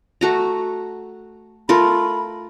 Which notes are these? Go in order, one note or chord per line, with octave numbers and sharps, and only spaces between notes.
A3 F#4 A#5
A3 F4 A#4 B5